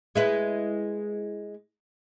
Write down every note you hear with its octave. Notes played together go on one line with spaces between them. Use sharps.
G#3 E4 B4